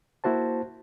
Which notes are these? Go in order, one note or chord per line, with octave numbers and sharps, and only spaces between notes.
A#3 E4 F#4 C5 A5